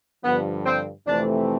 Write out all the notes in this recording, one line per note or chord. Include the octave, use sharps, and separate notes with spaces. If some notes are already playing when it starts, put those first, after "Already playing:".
G2 D3 F3 B3
C4
F2 C3 E3 A3 C4 D4